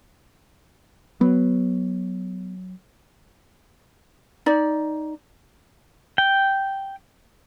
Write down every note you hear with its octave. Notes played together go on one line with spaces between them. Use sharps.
F#3 B3
D#4 D5
G5